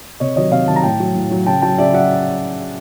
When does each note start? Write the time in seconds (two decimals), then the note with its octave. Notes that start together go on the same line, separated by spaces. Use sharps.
0.20 C3 C#5 D#5
0.36 D#3 F#3 C#5 D#5
0.51 C3 D#5 F5
0.68 D#3 F#3 A5
0.76 A#5
0.83 A2 G5 A5
1.00 F#3
1.15 A2
1.31 F#3
1.47 C#3 G5 A5
1.62 F#3 G5 A5
1.78 C#3 D5 E5
1.94 F#3 E5 F#5